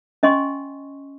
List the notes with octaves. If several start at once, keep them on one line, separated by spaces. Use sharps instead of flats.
C#4 D#5 G#5 C6 C#6